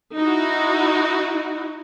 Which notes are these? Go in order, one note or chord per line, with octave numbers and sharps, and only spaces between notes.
D#4 E4 F#4